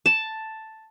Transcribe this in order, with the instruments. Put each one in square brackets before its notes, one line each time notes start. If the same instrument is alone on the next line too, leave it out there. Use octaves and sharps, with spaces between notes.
[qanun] A5